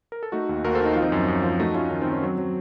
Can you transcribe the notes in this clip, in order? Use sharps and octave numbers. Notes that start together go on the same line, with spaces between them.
A#4
A4
A3 D#4 F#4
D#2
D#2 F#4 A#4
A4 C5
D#3 D#4
F3 F4
C4 D#4
F#2
F#2
F3
A3 D#4 F#4
A3 C#4 F4
D#3 C#4
C4 D#4
D#3
C#4
F#3 C4
F#3